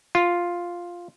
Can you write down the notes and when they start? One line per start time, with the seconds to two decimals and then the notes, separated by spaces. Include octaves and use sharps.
0.15 F4